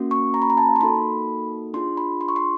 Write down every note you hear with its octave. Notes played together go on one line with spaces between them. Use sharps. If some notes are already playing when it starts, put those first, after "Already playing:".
Already playing: A#3 C#4 F#4
C#6
A#5
B5
A#5
A5
C6
A#3 D#4 F#4 A4 B5
D4 F4 G#4 C6
B5
C6
C#6
C6